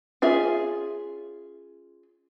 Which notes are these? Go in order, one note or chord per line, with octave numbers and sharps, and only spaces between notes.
C#4 F4 G#4 E5